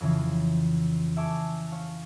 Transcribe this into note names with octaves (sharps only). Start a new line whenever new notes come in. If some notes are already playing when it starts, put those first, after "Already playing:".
F2 C#3 E3
E5 G#5 A5 C#6 D6 E6
C#5 F5